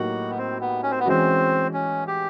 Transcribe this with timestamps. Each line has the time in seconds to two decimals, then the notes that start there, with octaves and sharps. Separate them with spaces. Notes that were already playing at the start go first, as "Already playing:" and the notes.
Already playing: A2 F#3 A#3 D#4 F#4 G4
0.30 B3
0.38 C4
0.61 B3
0.83 C#4
0.91 C4
1.00 B3
1.06 E3 G#3 C4 C#4 F#4
1.74 C#4
2.07 G4